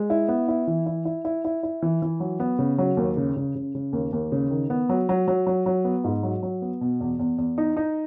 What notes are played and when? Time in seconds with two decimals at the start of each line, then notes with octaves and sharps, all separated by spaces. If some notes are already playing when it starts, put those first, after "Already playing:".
Already playing: G#3
0.10 E4
0.28 B3
0.48 E4
0.67 E3
0.86 E4
1.05 E4
1.25 E4
1.45 E4
1.63 E4
1.82 E3
2.02 E3
2.20 F#3
2.40 B3
2.59 C#3
2.78 F#3
2.97 D#2
3.17 C#3
3.36 C#3
3.55 C#3
3.75 C#3
3.93 D#2
4.13 D#2
4.32 C#3
4.51 D#3
4.70 B3
4.89 F#3
5.09 F#3
5.28 F#3
5.47 F#3
5.66 F#3
5.85 B3
6.04 G#2
6.23 F#3
6.43 F#3
6.62 B3
6.81 B2
7.01 E2
7.19 E2
7.38 E2
7.58 D#4
7.77 D#4